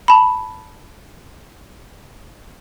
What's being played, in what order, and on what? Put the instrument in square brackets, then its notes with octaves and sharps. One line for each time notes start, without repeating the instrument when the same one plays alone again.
[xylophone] A5 B5